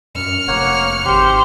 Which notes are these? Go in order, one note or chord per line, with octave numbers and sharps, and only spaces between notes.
F#2 F6 C#7
F1 A#3 C#5 F#5
G#1 G4 C5